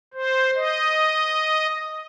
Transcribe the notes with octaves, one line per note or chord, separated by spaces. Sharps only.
C5
D#5